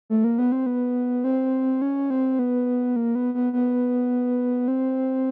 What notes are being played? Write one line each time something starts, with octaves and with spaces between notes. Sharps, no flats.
A3
A#3
B3
C4
B3
C4
C#4
C4
B3
A#3
B3
B3
B3
C4